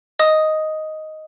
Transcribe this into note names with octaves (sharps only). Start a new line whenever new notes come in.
D#5 D#6